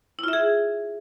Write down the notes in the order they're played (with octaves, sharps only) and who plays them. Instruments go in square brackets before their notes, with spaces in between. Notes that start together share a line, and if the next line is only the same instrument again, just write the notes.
[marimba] E4
F4
E5
G#4